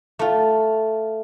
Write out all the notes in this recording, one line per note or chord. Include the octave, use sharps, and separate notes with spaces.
A3 F4